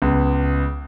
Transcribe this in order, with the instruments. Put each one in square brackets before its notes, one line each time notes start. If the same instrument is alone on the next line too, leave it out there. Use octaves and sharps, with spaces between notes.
[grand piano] C#2 G#3 B3